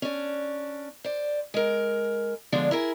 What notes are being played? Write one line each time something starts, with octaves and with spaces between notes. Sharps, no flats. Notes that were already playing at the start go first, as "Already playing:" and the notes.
C#4 D4
C5 D5
G#3 A#4
D3 F3 G#3 B3 D4
E4 G#4 A#4